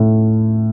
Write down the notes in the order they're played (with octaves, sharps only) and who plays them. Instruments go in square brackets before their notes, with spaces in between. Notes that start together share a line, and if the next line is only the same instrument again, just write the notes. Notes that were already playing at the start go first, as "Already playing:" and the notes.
Already playing: [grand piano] A2